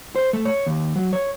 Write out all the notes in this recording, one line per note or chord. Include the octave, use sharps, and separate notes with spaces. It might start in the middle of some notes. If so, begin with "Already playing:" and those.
C5
A3
C#5
D#2
F#3
C#5